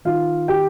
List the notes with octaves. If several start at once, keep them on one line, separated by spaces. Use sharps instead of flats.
D#3 F4 F5
G4 G5